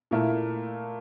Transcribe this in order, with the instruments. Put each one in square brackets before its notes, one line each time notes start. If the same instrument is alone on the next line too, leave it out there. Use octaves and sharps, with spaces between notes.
[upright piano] A#2 A3 E4 A#4